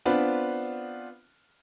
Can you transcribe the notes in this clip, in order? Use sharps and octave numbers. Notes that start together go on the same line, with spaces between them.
B3 C4 D4 F4 B4